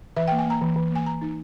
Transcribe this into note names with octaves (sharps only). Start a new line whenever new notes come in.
E3 E5
G5
A#3
G#5
A#3 A#5
E3
E3
A#3 G#5
E3 A#5
D#4